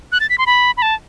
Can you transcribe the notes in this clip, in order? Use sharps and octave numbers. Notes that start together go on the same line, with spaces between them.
F#6
A6
B6
C6
B5
B5
A5